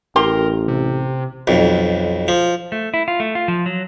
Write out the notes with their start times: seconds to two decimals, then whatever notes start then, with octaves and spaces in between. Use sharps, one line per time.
0.16 A1 G4 A#4 C6
0.68 C3
1.47 B1 F2
2.28 F3
2.72 A3
2.94 E4
3.08 F4
3.20 A3
3.35 F4
3.48 F3
3.66 F#3